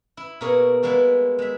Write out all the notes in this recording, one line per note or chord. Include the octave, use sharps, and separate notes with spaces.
E4
B2 A#3 G#4 A#4 C#5
G3 G#3 A#3 B3 E4
G#3 E5